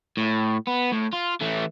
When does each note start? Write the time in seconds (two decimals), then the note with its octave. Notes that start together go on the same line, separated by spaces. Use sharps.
0.17 A2
0.67 B3
0.92 A2
1.13 F4
1.41 E3 A3